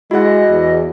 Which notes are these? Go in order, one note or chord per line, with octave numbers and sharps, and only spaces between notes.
G#3 E4 F#4 G#4 D#5 F#5
E2